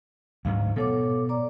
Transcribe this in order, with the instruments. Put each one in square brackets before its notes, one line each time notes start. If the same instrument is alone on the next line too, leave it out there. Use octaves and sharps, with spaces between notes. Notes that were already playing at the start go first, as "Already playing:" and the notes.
[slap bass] D2 G#2 F#3 [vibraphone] F5
[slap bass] B2 [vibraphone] A4 C#5 D6
[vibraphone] D5 A#5 D6